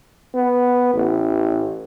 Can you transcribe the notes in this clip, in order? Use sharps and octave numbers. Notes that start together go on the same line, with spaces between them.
B3
A1